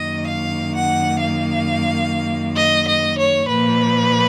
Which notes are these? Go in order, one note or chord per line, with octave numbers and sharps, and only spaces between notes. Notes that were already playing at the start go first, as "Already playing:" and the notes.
Already playing: F#2 D#3 A#3 D#5
F5
F#5
F5
D#5
D#5
C#5
A#2 F3 A#3 B4